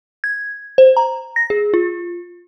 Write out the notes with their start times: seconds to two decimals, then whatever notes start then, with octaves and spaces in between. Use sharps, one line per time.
0.24 G#6
0.78 C5
0.97 A#5
1.36 A#6
1.50 G#4
1.74 F4